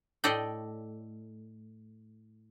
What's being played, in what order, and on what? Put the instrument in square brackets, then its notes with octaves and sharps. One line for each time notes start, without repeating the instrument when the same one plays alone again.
[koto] A2 A4 D5 D#5 G5